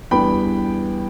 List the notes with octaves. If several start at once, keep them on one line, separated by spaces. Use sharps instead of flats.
E2 E3 G3 B3 D4 G5 B5